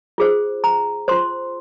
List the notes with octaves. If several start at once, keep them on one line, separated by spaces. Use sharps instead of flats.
F4 G#4 C5
A#5
F4 C5 C6